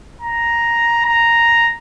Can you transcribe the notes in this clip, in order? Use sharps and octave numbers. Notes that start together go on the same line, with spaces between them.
A#5
A#5